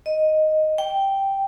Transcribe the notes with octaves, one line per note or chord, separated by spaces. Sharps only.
D#5
G5